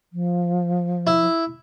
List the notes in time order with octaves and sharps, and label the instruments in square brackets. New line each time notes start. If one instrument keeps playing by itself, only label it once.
[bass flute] F3
[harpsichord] E4